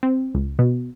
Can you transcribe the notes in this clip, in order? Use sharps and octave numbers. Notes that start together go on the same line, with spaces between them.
C4
C#2
B2